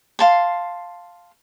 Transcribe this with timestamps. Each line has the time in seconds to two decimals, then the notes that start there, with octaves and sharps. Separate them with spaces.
0.19 F5 A5 C6